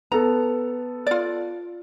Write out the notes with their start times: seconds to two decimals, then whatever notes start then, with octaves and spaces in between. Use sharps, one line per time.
0.12 B3 A4 A#5
1.07 F4 D5